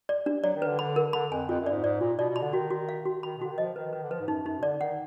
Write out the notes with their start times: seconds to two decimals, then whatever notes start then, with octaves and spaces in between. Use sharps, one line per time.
0.09 D5
0.26 D4
0.44 F#3 D5
0.56 D#3
0.62 B4
0.67 D3
0.79 D3 B5
0.96 A#4
1.13 D3 B5
1.32 F2 G#5
1.49 F2 F4
1.61 F#2
1.66 D5
1.72 G#2
1.84 G#2 D5
2.01 A#2 F4
2.19 B2 D5
2.30 B2
2.36 B5
2.42 D3
2.53 D#3 F#4
2.70 F#4
2.89 F5
3.06 F#4
3.23 D#3 B5
3.37 B2
3.42 D3 F#4
3.52 D#3
3.58 F3 D#5
3.76 D#3 B4
3.93 D#3 B4
4.03 D3
4.11 F3 B4
4.20 G#2
4.28 F#2 D#4
4.46 F#2 D#4
4.59 B2
4.63 D3 D5
4.80 D#3 F#5